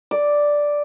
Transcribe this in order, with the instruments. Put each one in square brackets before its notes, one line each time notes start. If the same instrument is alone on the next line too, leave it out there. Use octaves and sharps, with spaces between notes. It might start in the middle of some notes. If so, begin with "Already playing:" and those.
[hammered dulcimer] D5